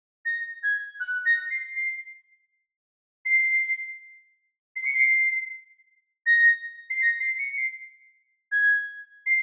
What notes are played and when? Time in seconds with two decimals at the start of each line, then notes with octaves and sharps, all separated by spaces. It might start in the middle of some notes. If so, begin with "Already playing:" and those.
0.25 A#6
0.63 G#6
1.00 F#6
1.26 A#6
1.51 C7
1.76 C7
3.26 C7
4.76 C7
4.85 C#7
4.94 C7
6.26 A#6
6.90 C7
7.02 A#6
7.20 C7
7.39 C#7
7.57 C7
8.52 G#6
9.26 C7